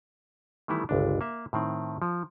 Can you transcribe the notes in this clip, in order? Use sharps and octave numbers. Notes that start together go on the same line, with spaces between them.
D#3 E3 G3 A3 B3 E4
G1 C#2 D4
A#3 E5
A2 D#3 C4
F3